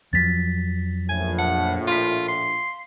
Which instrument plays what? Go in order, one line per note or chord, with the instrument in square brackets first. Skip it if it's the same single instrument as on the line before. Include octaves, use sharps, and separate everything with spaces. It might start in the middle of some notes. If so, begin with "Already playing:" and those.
[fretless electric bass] F2 F3 F#3 [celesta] A6 B6
[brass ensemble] A#1 A2 [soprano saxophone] G#5
[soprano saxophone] F#5 [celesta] A5
[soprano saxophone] F4 [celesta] F5 B6
[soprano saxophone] C6